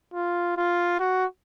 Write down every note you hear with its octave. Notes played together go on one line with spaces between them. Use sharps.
F4
F4
F#4